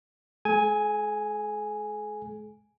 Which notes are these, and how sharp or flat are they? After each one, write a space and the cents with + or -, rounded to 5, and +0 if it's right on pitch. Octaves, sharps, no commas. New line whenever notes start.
G#3 +30 G#4 +45 G#5 +0